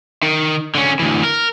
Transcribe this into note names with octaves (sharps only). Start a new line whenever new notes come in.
D#3
D3 C#4
D2 E3
A#4